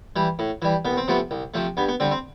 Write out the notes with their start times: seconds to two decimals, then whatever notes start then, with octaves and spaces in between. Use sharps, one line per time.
0.16 E3 G3
0.39 A2
0.62 E3 G3
0.85 C2 B3
0.97 C4
1.08 C3 F3 A3 B3
1.31 C2
1.54 C3 F3 A3
1.77 G2 B3
1.88 B3
2.00 D3 G3 C4
2.11 C4